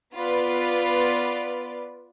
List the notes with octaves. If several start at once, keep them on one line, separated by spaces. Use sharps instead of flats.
B3 F4 B4 D5